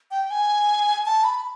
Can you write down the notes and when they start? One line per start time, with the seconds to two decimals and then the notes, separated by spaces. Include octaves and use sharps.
0.11 G5
0.31 G#5
1.06 A5
1.24 B5